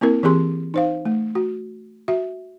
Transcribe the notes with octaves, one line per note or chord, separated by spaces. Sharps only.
A#3 C4 E4 A#4
E3 C4 G4 G#4 C6
D#4 C5 F5
A3
F#4
F#4 E5